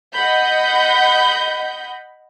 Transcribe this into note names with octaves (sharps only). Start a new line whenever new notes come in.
D#5 F#5 B5 G6